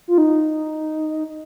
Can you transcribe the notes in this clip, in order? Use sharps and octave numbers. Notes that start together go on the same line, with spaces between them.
F4
D#4